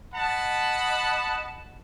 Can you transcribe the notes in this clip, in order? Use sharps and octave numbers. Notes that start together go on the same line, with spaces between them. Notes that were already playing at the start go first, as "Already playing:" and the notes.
D#5 F#5 A5 B5